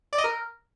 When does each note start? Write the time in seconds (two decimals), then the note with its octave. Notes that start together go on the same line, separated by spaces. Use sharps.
0.13 D5
0.18 D#5
0.24 A#4